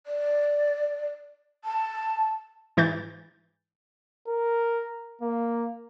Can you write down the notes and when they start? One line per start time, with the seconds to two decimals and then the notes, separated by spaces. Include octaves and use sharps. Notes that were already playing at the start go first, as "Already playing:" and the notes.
0.07 D5
1.64 A5
2.77 G#2 E3 G6 A6
4.28 A#4
5.21 A#3